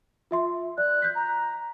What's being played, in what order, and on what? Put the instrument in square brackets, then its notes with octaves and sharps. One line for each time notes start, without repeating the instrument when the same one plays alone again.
[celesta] F4 E5 C6
[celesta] D5 [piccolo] F#6
[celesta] G6 B6
[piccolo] A#5